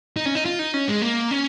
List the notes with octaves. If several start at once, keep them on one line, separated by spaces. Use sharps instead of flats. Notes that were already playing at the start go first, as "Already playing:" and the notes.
D#4
C#4
D#4
F4
D#4
C#4
G#3
A#3
C#4